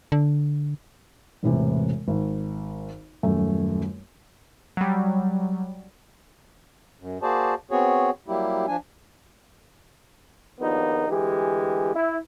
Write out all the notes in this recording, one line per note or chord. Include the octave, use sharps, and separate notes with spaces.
D3
E1 A2 C3 E3
G#1
D#1 F#2 A3
F#3 G3
F#2
A#3 F#4 G#4 C5 D5 A5
B3 C4 F#4 G#4 C#5
F#3 G3 A#3 E4 G4
F3 D4 G#5
A#1 D#2 A#2 B3 D#4
D2 E3 G#3 G4
E4